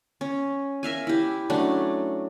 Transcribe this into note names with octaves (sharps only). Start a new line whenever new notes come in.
C#4
A#4 E5 F5 G#5
E4 G4
F#3 A3 C#4 D4